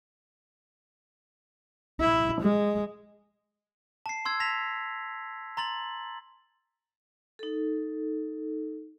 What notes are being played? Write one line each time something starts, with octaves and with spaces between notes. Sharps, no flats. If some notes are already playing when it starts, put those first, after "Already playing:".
E4
G#3
A5 C7
C6 E6 G#6
A5 A#6 B6 F7
A#5 C6 A6 F#7
D#4 A4